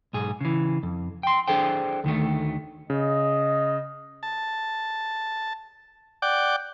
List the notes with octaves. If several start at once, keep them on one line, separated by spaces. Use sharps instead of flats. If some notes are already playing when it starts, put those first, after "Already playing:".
B1 G#2 G#4
C#3 E3
F2
G5 C6
D4 G#4 A4 C5 G5
D2 D#3 A3
C#3 D#5
A5
D5 F#5 G5 D6